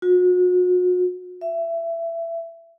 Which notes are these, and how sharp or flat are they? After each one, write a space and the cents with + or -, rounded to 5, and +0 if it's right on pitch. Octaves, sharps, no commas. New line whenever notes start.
F#4 -40
E5 +20